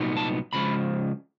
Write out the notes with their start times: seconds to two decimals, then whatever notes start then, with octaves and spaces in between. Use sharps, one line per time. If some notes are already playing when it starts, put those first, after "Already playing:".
Already playing: C2 A#2 F#3 B3 D#4
0.17 A5
0.53 D#2 C#3 F3 G#3 B5